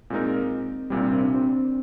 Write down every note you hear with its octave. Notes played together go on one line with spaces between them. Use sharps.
A#2 G#3 C4 D#4 A#4
C2 A#2 G3 C4
D4
C4
D4
C4